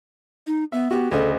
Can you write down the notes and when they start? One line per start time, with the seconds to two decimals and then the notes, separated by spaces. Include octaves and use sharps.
0.47 D#4
0.72 B3 E5
0.91 B3 F#4 G4
1.11 D2 C#3 A4 D#5